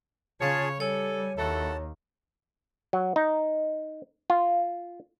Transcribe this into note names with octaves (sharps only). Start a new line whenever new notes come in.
C#3 F4 G#4 C#5 A5
G3 A4 C#5 G#5
D#2 E4 F#4 A4 A5
F#3
D#4
F4